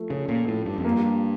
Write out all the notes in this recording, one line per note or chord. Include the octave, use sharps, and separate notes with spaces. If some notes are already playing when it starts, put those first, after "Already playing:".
Already playing: F3 A3
C#3 C#4
A#2
A2 F3
G2
F2
A#3
G2